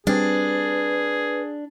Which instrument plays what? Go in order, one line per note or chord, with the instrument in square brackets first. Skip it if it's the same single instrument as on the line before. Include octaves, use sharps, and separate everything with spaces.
[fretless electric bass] G3 C4 [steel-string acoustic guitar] D4 [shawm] G#4 [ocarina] B4